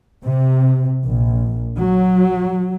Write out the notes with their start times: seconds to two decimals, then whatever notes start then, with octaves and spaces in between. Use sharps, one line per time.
0.23 C3
1.05 A#1
1.77 F#3